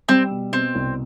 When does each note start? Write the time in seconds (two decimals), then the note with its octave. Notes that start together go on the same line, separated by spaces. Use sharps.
0.09 G3 C4
0.31 B2
0.52 B2 C4
0.75 C2